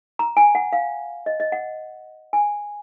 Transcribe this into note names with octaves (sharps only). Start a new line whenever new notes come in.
A#5
G#5
F#5
F5
D#5
D#5
F#5
G#5